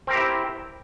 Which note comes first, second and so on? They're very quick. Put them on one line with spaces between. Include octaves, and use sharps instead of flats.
C4 A#4 G4 E4